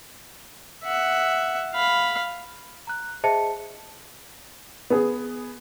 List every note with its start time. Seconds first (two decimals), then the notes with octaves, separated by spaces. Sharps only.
0.84 E5 F#5
1.74 F5 B5
2.87 A#5 F#6
3.24 G#4 C5 D#5 E5 A5 C#7
4.90 B3 G#4